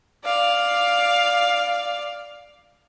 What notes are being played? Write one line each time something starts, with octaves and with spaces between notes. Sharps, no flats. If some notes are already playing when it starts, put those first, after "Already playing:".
D5 F5